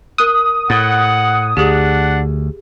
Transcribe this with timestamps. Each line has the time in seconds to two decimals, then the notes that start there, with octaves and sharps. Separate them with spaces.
0.18 A#4 D#6 F#6
0.70 A2 F#5 A6
1.57 D2 D4 G4 G#4 F#5